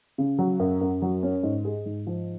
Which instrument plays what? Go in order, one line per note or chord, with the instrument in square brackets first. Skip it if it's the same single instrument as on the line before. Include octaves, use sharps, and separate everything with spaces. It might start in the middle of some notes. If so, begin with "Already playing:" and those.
[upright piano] C#3
F#3
F#2
F#2
F#3
C#4
G#2
G#4
G#2
F3